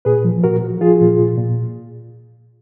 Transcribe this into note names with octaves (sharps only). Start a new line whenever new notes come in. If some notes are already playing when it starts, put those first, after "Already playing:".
A#2 G#4 B4
F3
A#2 F#4 A#4
F3
F3 F4 G#4
A#2
A#2
A#2